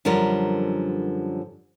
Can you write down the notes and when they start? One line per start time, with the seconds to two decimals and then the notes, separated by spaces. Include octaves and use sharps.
0.05 F#2 D3 F3 G3 A#4